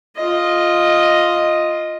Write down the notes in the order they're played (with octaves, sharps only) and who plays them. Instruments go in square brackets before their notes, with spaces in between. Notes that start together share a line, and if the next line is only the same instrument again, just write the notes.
[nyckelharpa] F4 D#5